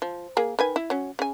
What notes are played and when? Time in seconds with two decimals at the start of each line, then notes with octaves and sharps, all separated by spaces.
0.02 F3
0.37 A#3 G#4
0.59 D#3 B4 G#5
0.76 E4
0.90 F#3 C#4
1.19 C#3 G#5